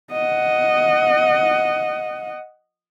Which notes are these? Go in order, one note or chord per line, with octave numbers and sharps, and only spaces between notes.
D#5 F#5